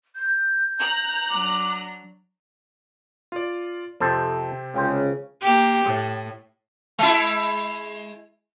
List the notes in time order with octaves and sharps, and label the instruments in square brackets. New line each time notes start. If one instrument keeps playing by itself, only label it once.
[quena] G6
[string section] A#5 F#6
[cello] F#3 D4 [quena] D6
[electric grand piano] F4 D5
[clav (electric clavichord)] F2 A4 C5 [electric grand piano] C3 C4
[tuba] C#2 [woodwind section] C#3 [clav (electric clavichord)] C5 G5
[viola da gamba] A#3 G4
A2
[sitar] G#3 E4